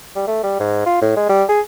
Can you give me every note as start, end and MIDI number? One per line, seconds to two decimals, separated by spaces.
0.15 0.27 55
0.27 0.42 57
0.43 0.58 55
0.60 0.84 44
0.86 0.97 65
1.01 1.13 45
1.16 1.26 56
1.29 1.44 55
1.49 1.60 68